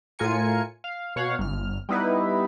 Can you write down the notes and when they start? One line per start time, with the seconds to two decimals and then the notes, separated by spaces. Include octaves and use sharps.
0.19 A2 F4 A#4 G#5 C#7
0.84 F5
1.16 B2 C#5 F5 F#5
1.39 G1 F6
1.89 G3 B3 D#4 E4 B4